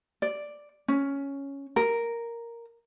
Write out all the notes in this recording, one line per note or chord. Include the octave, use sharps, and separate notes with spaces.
D5
C#4
A#4